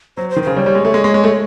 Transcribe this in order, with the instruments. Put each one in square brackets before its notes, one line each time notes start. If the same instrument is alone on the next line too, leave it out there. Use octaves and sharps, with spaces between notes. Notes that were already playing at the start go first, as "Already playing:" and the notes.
[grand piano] F#3 [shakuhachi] C5
[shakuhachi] C5
[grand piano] D#3
[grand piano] C#3 [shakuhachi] C5
[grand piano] G3 [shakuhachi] C#5
[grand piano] G3
G#3
A3
G#3
G#3
G#3
A3